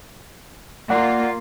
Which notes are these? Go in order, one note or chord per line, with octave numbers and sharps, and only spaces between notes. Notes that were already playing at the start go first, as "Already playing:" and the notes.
A#3 F4 D5 F#5